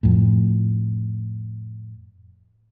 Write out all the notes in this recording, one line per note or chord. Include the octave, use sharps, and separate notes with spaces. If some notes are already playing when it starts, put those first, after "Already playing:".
F2 A2